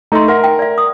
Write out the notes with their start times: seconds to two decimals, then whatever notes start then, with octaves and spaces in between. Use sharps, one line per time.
0.12 A3 D#4 A4 A#5 C6
0.28 A#4 E5 F#5 C6
0.44 G5
0.59 D5 E5
0.78 D#6